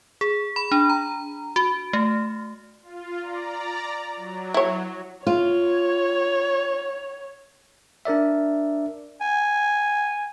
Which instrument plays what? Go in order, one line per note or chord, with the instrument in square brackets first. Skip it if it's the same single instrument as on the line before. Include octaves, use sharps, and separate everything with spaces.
[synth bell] G#4
B5
D4
A#5
F#4
A3
[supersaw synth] F4
D5 A#5
F#3
[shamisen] E4 C#5
[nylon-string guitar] F4 [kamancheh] C#5
[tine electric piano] D4 A#4 D5 E5
[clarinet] G#5